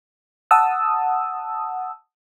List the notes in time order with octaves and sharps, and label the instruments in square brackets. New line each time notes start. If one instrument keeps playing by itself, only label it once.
[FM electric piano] F#5 A5 D#6 E6